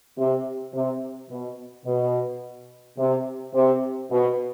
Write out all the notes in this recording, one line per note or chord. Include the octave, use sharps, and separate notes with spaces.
C3
C3
B2
B2
C3
C3
B2